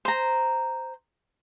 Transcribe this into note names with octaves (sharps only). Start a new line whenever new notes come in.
C5 A#5